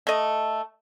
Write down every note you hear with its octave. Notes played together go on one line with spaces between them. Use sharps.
A3 D#5